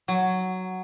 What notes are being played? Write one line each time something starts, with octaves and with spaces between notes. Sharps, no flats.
F#3